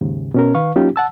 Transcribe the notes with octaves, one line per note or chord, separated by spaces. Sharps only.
D#2 G#2 C#3
B2 C#4 A#4
D#3 B4 F5 C#6
F#3 A#3 C#4 D#4 F4 G4
F#5 A5 E6